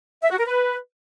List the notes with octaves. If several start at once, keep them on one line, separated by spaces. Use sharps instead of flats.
E5
F#4
A#4
B4